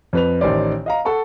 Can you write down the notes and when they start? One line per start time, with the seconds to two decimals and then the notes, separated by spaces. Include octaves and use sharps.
0.13 F2 B4 F7
0.41 A1 D#3 C5 D5
0.86 D#5 F5 A#5
1.05 A4 F#5 A5 C#6